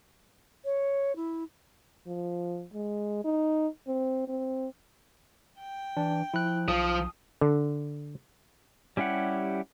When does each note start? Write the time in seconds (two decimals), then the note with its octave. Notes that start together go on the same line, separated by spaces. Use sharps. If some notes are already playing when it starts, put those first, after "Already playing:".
0.64 C#5
1.15 E4
2.07 F3
2.74 G#3
3.25 D#4
3.87 C4
4.28 C4
5.59 G5
5.97 E3 D4
6.34 F3 E4 F#6
6.68 B1 F3 D#6
7.41 D3
8.97 G3 C#4 E4 G4 F#5